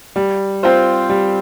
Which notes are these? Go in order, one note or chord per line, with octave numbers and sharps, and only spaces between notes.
G3
C4 F4 C5
G3